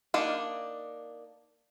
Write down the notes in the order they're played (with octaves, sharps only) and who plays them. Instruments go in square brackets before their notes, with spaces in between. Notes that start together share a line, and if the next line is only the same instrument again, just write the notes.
[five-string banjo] A#3 D4 D#4